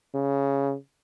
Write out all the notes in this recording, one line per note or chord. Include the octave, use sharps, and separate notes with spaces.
C#3